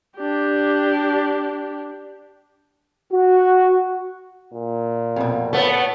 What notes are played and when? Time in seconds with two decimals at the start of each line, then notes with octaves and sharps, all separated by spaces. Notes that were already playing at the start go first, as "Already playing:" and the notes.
0.18 D4 G4
3.13 F#4
4.54 A#2
5.16 F2 B2
5.53 A3 B3 C#5 A5